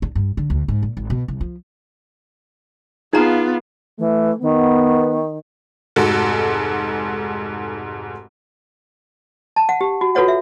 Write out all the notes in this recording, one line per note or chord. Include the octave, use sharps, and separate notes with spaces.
D4
G2
D3
D2
G#2
A#2
G#1
B2
C2
F3
B3 D#4 F4 G#4 F5 A#5
E3 A3
D#3 B3
F1 G#2 F#4 A4
A5
F#5
G4
F#4
F4 F#4 A4 B4 C#5 F#5
E5